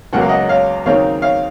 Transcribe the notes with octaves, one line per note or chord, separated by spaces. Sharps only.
C#2 C#3 F#3 A#3 F#5
F5
D#5 F#5
C#5 F5
D#2 C#3 F#3 C4 D#4 C#5 F5
C#5 F5